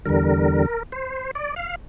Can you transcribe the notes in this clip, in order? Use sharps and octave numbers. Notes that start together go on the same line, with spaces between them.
E2 D3 G3 A#4
C5
D5
F5